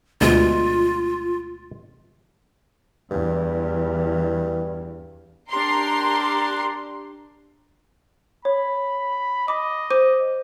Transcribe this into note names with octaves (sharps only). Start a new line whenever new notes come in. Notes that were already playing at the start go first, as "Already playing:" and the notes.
D2 B2 G#3 F4
E2 G2 E3
D4 G4 A#4 C6
C#5 B5
D#5 B5 D6
C5 D6 D#7